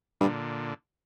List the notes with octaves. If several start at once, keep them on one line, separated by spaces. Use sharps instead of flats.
G2 A#2 D3